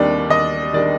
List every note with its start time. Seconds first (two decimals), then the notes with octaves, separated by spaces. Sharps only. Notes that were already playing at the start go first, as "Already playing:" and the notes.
Already playing: D#2 D#3 G3 D4 D5
0.29 D#2 D#5
0.73 D#3 G3 D4 D5